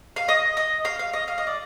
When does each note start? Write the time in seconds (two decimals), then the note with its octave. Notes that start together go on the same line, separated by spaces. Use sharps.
0.16 F5
0.28 D#5
0.57 D#5
0.85 F5
0.99 F5
1.13 D#5
1.28 F5
1.38 D#5
1.47 D5